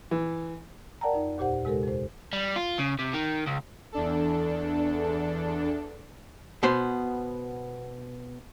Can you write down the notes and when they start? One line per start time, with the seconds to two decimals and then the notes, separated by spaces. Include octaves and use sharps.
0.11 E3
1.01 A#4 D5 F#5 G5 A5 A#5
1.13 F2 D#4
1.38 D#2 A#2 G4 C5 F#5
1.65 C3 G#3 G4 A4 A#4
1.83 F2 C5
2.33 G3
2.56 F4
2.79 C#3
2.99 C3
3.14 D#3
3.46 C#2
3.92 E2 D4 A4
6.63 B2 B3 C5